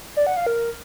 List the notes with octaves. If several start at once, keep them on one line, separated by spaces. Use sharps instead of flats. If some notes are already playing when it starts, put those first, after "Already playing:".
D5
F#5
F5
A#4